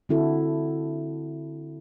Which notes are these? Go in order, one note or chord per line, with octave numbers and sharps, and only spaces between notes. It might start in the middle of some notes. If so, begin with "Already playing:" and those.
D3 C4 E4 F#4 A4